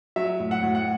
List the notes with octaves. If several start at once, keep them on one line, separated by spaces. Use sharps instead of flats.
F#3 E5
A2
F#5
A2
F#5